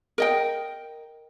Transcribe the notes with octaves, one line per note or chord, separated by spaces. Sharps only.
A#4 D#5 G5